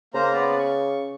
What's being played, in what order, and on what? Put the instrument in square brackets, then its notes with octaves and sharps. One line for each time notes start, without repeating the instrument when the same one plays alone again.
[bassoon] C#3 [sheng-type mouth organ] A#3 C5 A#5
[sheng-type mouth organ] B3 B4 D5
C#6